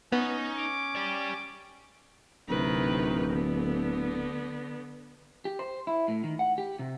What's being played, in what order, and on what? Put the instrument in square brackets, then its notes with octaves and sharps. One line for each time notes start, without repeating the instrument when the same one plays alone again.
[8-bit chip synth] B3 [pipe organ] C#4 [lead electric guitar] D#4
[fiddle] D6
[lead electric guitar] G4 D5
[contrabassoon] D1 [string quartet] C3 D#3 B4
[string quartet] D3 B3
[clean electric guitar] G4
C5
E4
A2
D#3
F#5
G4
C3